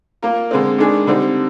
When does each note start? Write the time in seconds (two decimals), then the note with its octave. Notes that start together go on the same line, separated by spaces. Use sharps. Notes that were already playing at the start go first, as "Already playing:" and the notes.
0.22 A#3 F4 A#4
0.51 D3 G#3 C4
0.78 D#3 G#3 D4 G#4
1.07 D3 G3 C4 D#4